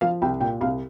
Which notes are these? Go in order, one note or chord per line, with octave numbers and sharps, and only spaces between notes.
F3 F5
C2 G5
A#2 G5
C2 F5